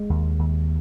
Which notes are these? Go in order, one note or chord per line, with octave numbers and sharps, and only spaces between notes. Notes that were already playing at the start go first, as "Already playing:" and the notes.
Already playing: G#3
D#2
D#2